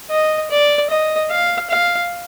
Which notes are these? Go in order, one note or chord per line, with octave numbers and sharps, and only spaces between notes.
D#5
D5
D#5
F5
F5